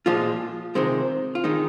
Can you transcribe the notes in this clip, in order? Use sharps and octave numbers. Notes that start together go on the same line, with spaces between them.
A#2 F3 G#3 F4
C3 D#3 G#3 C4
F4
D#3 G#3 D#4